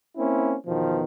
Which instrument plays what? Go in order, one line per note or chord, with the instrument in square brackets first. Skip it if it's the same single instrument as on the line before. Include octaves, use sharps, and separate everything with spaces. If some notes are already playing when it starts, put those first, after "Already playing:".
[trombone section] A#3 C4 C#4 E4
E2 B2 D#3 F3